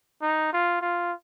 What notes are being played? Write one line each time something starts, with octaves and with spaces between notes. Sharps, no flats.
D#4
F4
F4